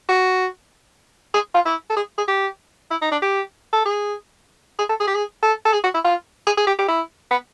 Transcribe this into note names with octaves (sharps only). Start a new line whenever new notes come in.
F#4
G#4
F4
E4
A4
G#4
G#4
G4
E4
D#4
D4
G4
A4
G#4
G#4
A4
G#4
G4
G#4
A4
A4
G#4
F#4
E4
F4
G#4
G#4
G4
G4
E4
B3